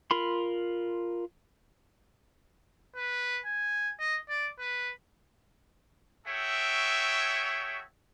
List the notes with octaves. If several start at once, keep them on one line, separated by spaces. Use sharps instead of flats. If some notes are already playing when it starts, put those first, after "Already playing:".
F4 A#4 B5 C6
B4
G#5
D#5
D5
B4
F#4 G#4 A4 C#5 E5 G5